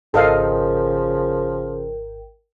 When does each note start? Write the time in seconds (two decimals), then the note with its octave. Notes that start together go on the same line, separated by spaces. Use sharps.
0.14 G#1 C#3 F3 A4 A#4 D#5 F5 G5